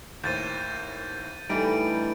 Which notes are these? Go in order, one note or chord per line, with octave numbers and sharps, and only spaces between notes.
D#2 A2 C5 G6 A6 D#7
A2 D3 E3 G3 D#4 D7